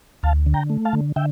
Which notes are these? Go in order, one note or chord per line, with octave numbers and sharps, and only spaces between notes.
D2 F5 A5
D3
G5 A#5
A3
F5 A5
D3
D3 E5 G5